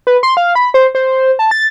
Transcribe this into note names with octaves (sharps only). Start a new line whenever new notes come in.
B4
C6
F5
B5
C5
C5
A5
A6